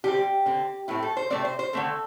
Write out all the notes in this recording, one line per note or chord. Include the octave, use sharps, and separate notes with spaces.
D3 G3 C4 G4
D3 C4
A2 A3 C4 E4
A4
C5
C3 A3 C4 D5
C5
C5
D3 A3 C4 A4